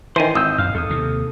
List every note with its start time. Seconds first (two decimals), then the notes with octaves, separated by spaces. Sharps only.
0.16 D#3 E3 C5 G#5
0.35 G#1 D#6 E6 G6
0.58 F#2 F5 F6
0.75 E2 A4 D#6
0.90 D#2 C3